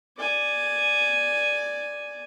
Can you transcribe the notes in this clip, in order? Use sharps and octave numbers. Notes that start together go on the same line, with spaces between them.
D5 G#5